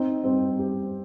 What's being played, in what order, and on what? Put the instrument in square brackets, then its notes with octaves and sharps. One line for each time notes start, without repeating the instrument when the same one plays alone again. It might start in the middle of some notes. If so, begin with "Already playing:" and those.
Already playing: [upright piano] C4 [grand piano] D#4
[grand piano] G3 [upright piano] C4
[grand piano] G4